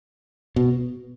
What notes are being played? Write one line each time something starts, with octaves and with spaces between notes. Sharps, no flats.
B2